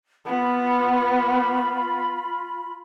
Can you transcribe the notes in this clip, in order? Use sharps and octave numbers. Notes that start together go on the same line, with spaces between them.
B3 F4 B5